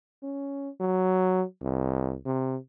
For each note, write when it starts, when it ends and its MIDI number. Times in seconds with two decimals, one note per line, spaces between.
0.23 0.69 61
0.80 1.43 54
1.62 2.15 36
2.25 2.56 48